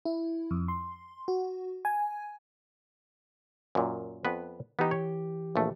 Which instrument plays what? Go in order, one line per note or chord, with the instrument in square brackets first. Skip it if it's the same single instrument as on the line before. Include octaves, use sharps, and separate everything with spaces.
[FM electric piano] E4
F2
C6
F#4
G#5
[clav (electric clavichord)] F#2 A#2
F2 B3 B4
[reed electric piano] E3 G4 [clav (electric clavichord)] B3 D#4
[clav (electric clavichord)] C#5
A#1 E2 A3